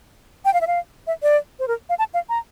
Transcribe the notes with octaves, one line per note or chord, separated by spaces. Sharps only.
G5
F5
E5
F5
E5
D5
C5
A#4
F5
A5
F5
A#5